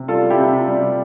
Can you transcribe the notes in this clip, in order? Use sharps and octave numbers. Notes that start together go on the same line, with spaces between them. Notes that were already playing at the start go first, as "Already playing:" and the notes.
Already playing: C3
G3 F4 A4
G3
E4 G4
C3
C3 F4
G3
G3